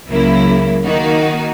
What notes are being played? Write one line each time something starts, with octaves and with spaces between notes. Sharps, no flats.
C#2 C#3 F#3 A#3 E4
D#3 A#3 D#4 F#4